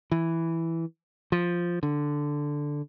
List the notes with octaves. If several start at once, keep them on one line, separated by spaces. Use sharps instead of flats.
E3
F3
D3